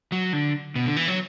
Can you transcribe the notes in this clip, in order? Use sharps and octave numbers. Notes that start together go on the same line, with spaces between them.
F#3
D3
B2
D3
E3
F#3